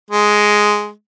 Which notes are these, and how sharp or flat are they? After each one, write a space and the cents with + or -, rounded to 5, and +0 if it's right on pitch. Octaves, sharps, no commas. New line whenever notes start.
G#3 +5